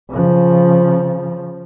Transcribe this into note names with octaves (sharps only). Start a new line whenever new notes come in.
C#3 F3